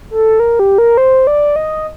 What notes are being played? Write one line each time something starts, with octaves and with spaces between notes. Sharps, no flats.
A4
A#4
G4
A#4
C5
D5
D#5